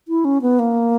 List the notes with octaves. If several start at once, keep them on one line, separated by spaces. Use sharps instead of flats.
E4
C#4
B3
A#3